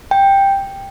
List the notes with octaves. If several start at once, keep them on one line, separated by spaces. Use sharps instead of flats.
G5